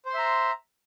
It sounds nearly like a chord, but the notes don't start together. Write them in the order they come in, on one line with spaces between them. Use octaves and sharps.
C5 C6 E5 A#5